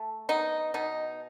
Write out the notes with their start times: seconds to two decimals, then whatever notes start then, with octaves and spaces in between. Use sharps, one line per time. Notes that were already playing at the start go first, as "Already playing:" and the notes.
Already playing: A3
0.29 B3 D#4
0.74 B2 D#4